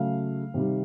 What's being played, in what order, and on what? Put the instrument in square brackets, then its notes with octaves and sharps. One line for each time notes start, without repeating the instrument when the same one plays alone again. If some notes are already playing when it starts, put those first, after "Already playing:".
Already playing: [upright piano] C#3 F#3 A3 F5
C3 D#3 G3